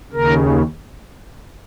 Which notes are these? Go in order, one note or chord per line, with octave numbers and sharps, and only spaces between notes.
D#2 C#3 A#4